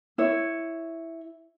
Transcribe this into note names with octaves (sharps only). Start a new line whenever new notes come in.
E4 C#5